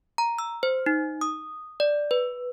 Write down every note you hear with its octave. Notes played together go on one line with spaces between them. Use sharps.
A#5
E6
C5
D#4
D#6
D5
B4